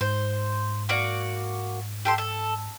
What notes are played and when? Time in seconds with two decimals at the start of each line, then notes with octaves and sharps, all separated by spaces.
0.01 G#2 C5
0.89 A#3 F#4 D5
2.05 G4 A4 C6
2.18 A4